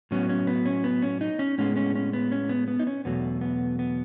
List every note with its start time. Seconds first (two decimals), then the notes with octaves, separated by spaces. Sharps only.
0.11 A2 F#3 B3 C#4
0.29 C#4
0.47 B3
0.66 C#4
0.84 B3
1.02 C#4
1.21 D#4
1.39 C#4
1.58 A2 G#3 B3 C#4
1.76 C#4
1.95 C#4
2.13 B3
2.32 C#4
2.49 B3
2.68 B3
2.79 D#4
2.87 C#4
3.05 E2 B2 F#3 A3 B3
3.41 B3
3.79 B3